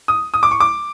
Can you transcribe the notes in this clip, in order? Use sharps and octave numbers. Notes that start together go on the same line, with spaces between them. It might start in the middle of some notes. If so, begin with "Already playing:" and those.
D#6
D#6
D6
C#6
D6